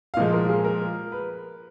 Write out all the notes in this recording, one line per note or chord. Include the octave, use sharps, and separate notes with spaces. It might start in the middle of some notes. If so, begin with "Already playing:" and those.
F5
A#2 F3 G#3 D#5
A#4
G#4
A#4
B4